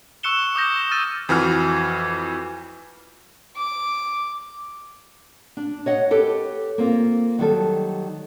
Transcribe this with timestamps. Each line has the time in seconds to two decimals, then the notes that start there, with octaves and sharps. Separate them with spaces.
0.23 C#6 E6 F#6 C#7 E7 G7
0.55 D6 D#6 G6 A#6
0.91 E6 F6 A6 D#7
1.29 F2 E3 F#4 F6
3.56 D6
5.57 D4
5.86 C#5 D#5 F#5
6.11 G4 A4 B4
6.78 A#3 C4 F4
7.39 D#3 F#3 G3 A4